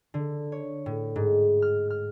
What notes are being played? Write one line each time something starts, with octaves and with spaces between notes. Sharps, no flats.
D3
C#5
A2
G#2
F6
F6